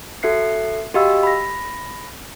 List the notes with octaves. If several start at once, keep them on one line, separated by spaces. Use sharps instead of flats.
F#4 A4 E5 F#6 C7 C#7
F#4 G4 D#5 F5 B5 E6
B5 A#6